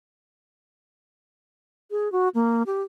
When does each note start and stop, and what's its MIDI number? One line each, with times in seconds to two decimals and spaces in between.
1.91 2.11 68
2.12 2.29 66
2.35 2.63 58
2.66 2.82 67